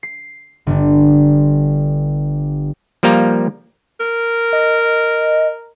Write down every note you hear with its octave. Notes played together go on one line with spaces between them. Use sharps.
C7
G1 D3
F3 G3 A#3 F5 A#5
A#4
D#5